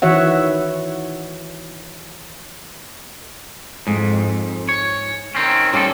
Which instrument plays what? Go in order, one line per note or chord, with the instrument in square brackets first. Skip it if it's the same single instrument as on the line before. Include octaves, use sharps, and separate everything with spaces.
[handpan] D#3 E3 F#4 C#5 E5 F#5
[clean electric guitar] F2 [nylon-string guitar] G#2
[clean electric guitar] C#5
D#3 C4 C#4
[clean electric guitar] D#3 A#3 A4 [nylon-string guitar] G3 C#4 G4